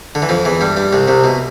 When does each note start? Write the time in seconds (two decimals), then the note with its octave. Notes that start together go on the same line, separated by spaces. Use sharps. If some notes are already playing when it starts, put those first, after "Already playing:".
0.15 D3
0.22 E3
0.29 F2 F3
0.45 E2 E3
0.61 G2 G3
0.77 G2 G3
0.93 C2 C3
1.08 C2 C3
1.24 B2